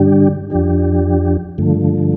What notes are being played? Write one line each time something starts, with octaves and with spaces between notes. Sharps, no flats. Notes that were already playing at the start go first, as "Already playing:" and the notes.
Already playing: G2 D3 G3 D4 G4
F2 F3 D4 G4
G2 D3 F3 A3